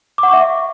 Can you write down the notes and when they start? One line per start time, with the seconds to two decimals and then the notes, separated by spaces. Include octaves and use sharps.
0.18 D6
0.23 F#5
0.28 C#6
0.33 E5